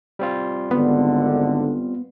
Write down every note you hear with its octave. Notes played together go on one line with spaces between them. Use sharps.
G3 C4 F4
G#1 D3 B3